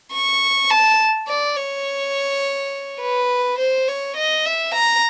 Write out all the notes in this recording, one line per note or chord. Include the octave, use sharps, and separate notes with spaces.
C#6
A5
D5
C#5
B4
C5
C#5
D#5
E5
A#5